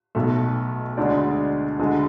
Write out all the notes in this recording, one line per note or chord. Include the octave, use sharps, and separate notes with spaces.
B1 B2 A3
D2 D3 G#3 D5
D2 D3 G#3